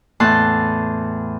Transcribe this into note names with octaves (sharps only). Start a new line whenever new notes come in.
E2 A2 A5 C6 F#6